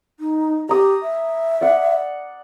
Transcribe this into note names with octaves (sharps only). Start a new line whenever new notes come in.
D#4
G4 A#5 D#6
E5
D5 F#5